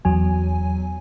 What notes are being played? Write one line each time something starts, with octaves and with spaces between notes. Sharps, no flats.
E2 F#3 G#5